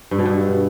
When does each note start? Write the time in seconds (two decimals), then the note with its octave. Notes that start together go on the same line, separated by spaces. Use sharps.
0.11 G2
0.19 B2
0.26 G2